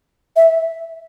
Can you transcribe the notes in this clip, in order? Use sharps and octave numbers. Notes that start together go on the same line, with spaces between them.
E5